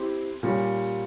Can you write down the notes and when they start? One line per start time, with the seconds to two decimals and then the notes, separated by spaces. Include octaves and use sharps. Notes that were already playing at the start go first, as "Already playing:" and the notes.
Already playing: C4 E4 G4 C5
0.43 A#2 G3 C#4 G4